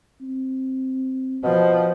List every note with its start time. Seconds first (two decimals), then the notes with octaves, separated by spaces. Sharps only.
0.21 C4
1.43 B2 F3